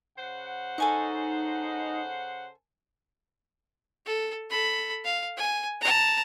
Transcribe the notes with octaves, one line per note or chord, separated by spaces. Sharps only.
C#3 C5 F#5
D#4 A4 G#5 C#6
A4
A4 B5
F5
G#5
A5 A#5